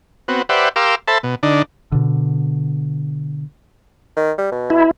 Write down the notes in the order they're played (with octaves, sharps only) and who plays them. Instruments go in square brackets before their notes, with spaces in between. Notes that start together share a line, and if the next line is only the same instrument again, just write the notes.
[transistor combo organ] B3 C4 F#4
G4 B4 C5 D5 E5 F#5
G4 A#4 F5 C6 D6 E6
A4 C5 E5 A5 B5
B2
D3 D4 D#4
[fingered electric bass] B2 D3
[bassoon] D#3
G3
B2
[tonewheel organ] E4